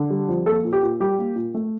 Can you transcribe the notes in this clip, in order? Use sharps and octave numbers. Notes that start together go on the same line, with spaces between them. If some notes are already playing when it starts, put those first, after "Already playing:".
Already playing: D3
G3
F2
A#3 A4
A#2
G4
A#2
G3 G4
A#3
A#2
A3